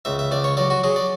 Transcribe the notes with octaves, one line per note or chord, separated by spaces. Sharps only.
C#2 E5
E5
C#2 D5
C#5
F#3 D5
F#4
F#3 G#4
D5